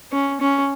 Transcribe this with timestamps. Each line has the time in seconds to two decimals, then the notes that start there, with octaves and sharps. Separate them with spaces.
0.12 C#4
0.40 C#4